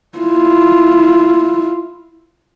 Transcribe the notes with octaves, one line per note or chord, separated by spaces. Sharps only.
E4 F4